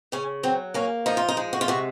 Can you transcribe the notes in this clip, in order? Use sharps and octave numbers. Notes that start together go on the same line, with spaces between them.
C#3 C#4
F#3 C4
A#3 C#4
F3 D#4
F4
D#4
G#3
F#4
F4
C3 F#4